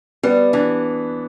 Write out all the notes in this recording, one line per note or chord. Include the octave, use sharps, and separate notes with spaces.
G3 B3
E3 D4